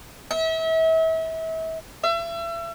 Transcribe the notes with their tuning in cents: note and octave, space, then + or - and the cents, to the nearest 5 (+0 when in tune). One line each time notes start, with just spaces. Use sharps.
E5 -35
E5 +35